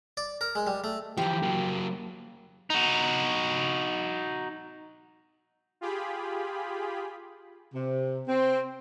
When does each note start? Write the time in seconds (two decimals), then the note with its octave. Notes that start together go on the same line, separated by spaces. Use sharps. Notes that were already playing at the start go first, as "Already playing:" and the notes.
0.17 D5
0.41 A#4
0.55 G#3
0.67 G3
0.84 A3
1.18 E3 F3 G4 A#5
1.43 F#3 A#3
2.70 D#4 F#4
5.81 F4 G4 G#4 B5
7.74 C3
8.27 C4